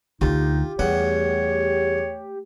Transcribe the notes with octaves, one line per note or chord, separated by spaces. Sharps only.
D2 D3 D#4 F4 G4
E2 G3 A3 C#5 F#5